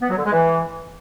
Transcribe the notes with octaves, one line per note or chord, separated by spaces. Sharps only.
B3
F#3
D3
G#3
E3